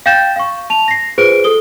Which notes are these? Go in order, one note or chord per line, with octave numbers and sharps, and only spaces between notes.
F5 G5 G6 A6 E7
F5 C#6
A5 F7
A#6 C7
F4 G#4 B4 C5 D7
A4 D#6 G7